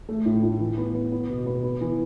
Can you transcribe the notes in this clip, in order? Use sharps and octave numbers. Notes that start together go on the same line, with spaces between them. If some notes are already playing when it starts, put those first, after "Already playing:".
A3
A2
A2
E3
B3
B3
B3
B2
B3
B3
E3